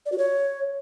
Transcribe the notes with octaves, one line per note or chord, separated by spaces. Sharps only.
D5
F#4
C#5